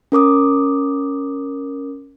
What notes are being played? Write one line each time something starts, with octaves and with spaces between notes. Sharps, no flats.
C#4 A#4 D6 D#6